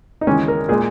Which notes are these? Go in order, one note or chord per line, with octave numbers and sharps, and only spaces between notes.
D#4
D#2 C#3 E3 G#3 C#4
A#4
A#2 G#3 G#4